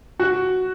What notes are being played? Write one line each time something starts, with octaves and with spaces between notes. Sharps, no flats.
F#4